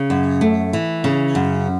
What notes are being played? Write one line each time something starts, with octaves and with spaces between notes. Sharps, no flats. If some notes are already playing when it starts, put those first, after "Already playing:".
Already playing: C#3
F#2
A3
E3
C#3
F#2